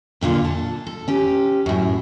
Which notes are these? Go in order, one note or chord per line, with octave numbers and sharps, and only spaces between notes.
F2 A#2 D3 F4
A5
A4
C#4 G4
F#2 A2